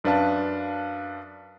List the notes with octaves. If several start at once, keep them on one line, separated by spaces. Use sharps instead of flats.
F#2 D4 B4 F5 A5